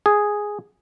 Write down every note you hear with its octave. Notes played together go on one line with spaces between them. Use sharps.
G#4